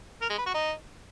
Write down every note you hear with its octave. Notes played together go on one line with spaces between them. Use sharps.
A#4
G#3
B4
F#4
D#4